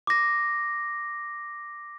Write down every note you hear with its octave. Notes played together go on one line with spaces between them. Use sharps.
D6 A#6